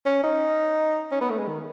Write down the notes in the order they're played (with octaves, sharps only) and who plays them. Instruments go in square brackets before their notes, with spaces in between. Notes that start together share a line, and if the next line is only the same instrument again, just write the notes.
[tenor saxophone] C#4
D#4
C#4
B3
A3
G#3
D#3